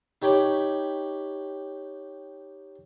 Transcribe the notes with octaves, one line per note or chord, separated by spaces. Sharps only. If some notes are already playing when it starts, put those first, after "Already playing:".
D#4 G4 C#5 B5 D6